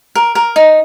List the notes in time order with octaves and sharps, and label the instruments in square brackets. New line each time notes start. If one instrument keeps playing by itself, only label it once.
[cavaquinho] A#4
A#4
D#4